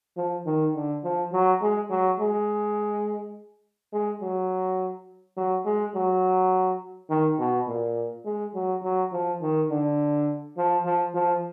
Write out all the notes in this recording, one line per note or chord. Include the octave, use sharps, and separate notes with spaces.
F3
D#3
D3
F3
F#3
G#3
F#3
G#3
G#3
F#3
F#3
G#3
F#3
D#3
B2
A#2
G#3
F#3
F#3
F3
D#3
D3
F3
F3
F3